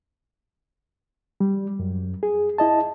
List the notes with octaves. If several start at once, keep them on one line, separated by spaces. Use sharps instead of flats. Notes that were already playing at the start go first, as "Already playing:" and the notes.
G3
F#2
G#4
E4 D#5 A5